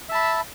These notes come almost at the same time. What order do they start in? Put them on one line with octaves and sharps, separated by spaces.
E5 A5 B5